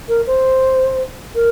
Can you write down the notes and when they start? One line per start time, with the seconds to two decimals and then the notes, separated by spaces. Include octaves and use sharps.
0.09 A#4
0.27 C5
1.35 A#4